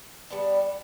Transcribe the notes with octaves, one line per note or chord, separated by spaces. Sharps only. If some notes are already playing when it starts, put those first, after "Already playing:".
G3 B3 D4